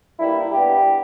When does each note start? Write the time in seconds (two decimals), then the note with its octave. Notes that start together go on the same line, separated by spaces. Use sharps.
0.19 G2 G3 A#3 E4
0.51 G2 G3 B3 G4